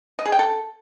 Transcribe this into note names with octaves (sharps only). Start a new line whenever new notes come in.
D#5
G#4
G5
A4